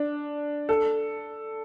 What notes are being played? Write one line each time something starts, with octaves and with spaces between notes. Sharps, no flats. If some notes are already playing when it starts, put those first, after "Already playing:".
Already playing: D4
A4